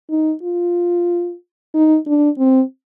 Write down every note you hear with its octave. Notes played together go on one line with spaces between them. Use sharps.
D#4
F4
D#4
D4
C4